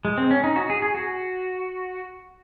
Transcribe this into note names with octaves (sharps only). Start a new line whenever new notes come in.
G#3
C4
C#4
D#4
F#4
G#4
G#4
F#4